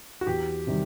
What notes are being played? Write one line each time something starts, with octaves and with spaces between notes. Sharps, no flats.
F#4
E2 G4
C3 D#3 G3